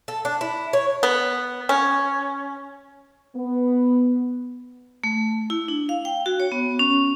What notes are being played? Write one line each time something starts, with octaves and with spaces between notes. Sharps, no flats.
A4
D4
E4
C#5
B3
C#4
B3
A3
E4
D4
F5
G5
F#4
C#5
B3
C#4